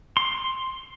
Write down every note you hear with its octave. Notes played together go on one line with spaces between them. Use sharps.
C6